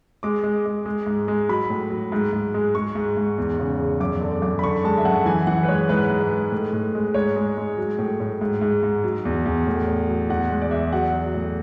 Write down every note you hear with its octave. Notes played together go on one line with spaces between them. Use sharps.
G#3 D6
G#3
G#3
G#3
G#2
G#3
F#3 B5
A2
F#3
G#2
G#2
G#3
G#3 C#6
G#2
G#2
E2
C#3
E2
F#2 D6
D3
F#2 D6
B5
D3 C#6
G#3 A5
E5
F#2 F#5
E3 G#5
E3 F#5
B4
G#3 C#5
G#2 B4
G#2
G#3
A2
A2
G#3
G#2 C#5
G#3
G#3
F#3
A2
A2
G#2
G#2
G#2
F#3
E2
E2
A2
A2
F#3
E2 F#5
G#3
D5
E2 E5
F#3 F#5
F#3
A2